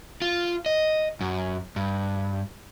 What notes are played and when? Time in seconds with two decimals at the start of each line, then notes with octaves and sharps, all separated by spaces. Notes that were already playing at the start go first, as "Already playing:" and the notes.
0.22 F4
0.66 D#5
1.21 F#2
1.76 G2